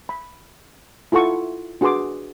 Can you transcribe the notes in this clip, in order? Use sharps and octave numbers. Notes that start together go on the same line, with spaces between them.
B5
E4 F4 A4 F#5 C#6
D4 F#4 G#4 B4 C6 D6